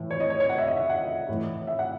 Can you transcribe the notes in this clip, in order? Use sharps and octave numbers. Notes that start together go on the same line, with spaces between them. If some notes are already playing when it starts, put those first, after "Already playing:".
Already playing: A2 E3
C#5
D#5
C#5
C#5
F#5
E5
D#5
E5
F#5
A2 E3
E5
F#5